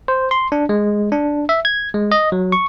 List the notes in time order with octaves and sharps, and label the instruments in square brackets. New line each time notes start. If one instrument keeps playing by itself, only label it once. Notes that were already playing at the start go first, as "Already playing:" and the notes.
[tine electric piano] C5
C6
D4
G#3
D4
E5
G#6
G#3
D#5
F#3
C#6